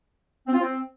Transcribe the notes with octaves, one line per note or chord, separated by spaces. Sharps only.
C4
F4
C4